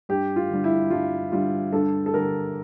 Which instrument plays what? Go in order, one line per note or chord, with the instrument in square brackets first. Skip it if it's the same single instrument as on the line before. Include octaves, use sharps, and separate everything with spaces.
[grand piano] G2 [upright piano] G4
[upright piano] F4
[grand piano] D3 G3
[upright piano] E4
[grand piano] G2 [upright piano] F4
[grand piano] D3 G3 [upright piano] F4
[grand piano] G2 [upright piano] A4
[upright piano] A4
[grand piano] D3 G3 [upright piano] A#4